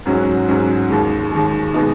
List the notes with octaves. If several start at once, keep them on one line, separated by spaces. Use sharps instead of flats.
G#2 F#3 C#4 F#4
G#2 F#3 C#4 F#4
D#2 D#3 G#3
D#2 D#3 G#3
B2 G#3 B3 D#4